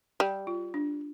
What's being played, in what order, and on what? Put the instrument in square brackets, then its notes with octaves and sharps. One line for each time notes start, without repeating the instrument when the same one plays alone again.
[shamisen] G3 [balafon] G4
[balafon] F4
D4